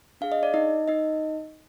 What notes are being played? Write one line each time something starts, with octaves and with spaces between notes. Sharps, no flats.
D4 G#4 F5
D#5
D5
D#4 D#5
D#4 D#5